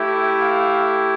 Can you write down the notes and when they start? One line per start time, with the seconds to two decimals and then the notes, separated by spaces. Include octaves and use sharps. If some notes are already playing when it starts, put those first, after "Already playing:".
Already playing: A3 E4 G4
0.40 F5